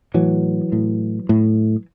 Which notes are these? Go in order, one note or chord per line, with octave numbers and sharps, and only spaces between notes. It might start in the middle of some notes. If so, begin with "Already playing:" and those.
A2 E3 F#3
A2
A2